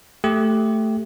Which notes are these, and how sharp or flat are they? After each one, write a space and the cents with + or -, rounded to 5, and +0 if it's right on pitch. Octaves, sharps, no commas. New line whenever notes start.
A3 +0 G4 +0